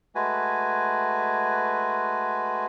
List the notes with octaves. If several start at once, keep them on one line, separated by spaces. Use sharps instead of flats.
G#3 A3 F#4 B4 G#5